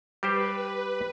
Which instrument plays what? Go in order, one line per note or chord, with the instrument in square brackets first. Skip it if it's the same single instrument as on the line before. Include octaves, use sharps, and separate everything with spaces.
[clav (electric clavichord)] G3 G4 C5 [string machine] B4